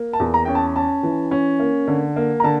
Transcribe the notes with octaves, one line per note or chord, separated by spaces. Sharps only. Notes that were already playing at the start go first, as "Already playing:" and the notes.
Already playing: A#3
A5
E2
A#5
C#4 G5
A5
C#4 A5
E3
C#4
A#3
D3
A#3
A#5
D3 A5